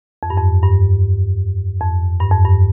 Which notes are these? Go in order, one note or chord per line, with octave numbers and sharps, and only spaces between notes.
F2
G2
F2
G2
F2
G2
F2
G2